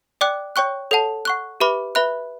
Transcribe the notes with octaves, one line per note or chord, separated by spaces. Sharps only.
D5 G5 D6 F#6
C#5 G5 C#6 F#6
A4 C#5 F#5 A5
F#5 C#6 F#6
G4 B4 E5 B5 D6
B4 E5 B5 F#6